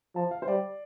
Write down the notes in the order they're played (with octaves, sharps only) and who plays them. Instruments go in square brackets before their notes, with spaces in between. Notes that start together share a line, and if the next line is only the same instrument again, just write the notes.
[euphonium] F3 [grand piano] A5
[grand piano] F5
C5
[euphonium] G3 [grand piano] D5